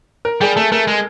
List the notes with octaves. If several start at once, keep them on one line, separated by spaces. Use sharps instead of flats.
A#4
G3 G#4
A3 A4
A3 A#4
G#3